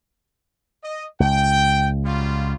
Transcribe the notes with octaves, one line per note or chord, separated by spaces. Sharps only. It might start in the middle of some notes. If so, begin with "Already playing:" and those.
D#5
C#2 G5
F#3 G3 F4